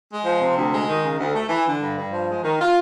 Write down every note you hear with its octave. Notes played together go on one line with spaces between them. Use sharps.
G#3
F3
C3
D2
G#3
D#3
C#3
D2
A3
E3
D3
G2
G2
F3
G#3
D#3
F4